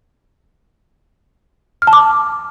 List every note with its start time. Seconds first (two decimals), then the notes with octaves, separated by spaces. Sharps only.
1.82 F6
1.87 A5
1.93 D6